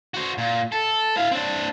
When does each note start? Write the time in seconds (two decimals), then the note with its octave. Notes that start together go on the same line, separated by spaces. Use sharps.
0.14 F#4 C5
0.38 A#2
0.72 A4
1.17 E4 F5
1.31 C4 D4